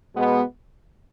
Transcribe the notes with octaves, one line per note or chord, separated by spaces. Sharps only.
B2 G#3 B3